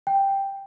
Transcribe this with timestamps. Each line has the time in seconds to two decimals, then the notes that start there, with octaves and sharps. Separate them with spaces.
0.07 G5